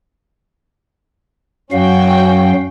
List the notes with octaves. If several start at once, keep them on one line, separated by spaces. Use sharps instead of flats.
F#2 F#3 C#4 F#4 F5 G5